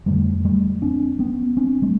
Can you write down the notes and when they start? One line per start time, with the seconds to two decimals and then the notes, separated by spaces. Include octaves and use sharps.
0.06 F2 D3 G3 A3
0.45 G3 A3
0.82 C4 D4
1.19 B3 C#4
1.57 C4 D4
1.82 G3 A3